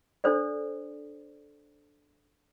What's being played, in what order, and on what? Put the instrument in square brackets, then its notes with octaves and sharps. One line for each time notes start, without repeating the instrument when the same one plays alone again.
[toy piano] D4 A4 C5 D5